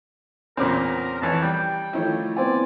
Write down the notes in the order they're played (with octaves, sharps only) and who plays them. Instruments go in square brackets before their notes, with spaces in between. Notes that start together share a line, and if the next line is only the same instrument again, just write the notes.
[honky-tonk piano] E2 C#4 D6 [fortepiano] A#2 C#3 C4 [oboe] A#4
[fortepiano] F2 E3 C#5 [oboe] A5
[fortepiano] G3 [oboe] G5
[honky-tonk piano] D#3 F3 A3 [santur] E4 C#5
[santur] B3 C4 G#5 [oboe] D5